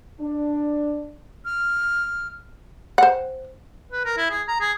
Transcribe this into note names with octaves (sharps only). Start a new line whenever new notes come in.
D4
F6
C5 F#5
B4
A#4
E4
G#4
A#5
G#4